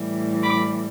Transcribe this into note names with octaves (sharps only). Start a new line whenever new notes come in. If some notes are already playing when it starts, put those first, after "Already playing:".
Already playing: A2 E3 G3
B5 D6